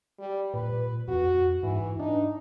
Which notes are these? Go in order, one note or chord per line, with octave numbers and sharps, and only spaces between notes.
G3
A#2 B4
F2 F#4
G#2 E3
D4 D#4